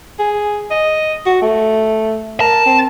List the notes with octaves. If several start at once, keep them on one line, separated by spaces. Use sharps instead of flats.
G#4
D#5
F#4
A3
A#4 A5
C4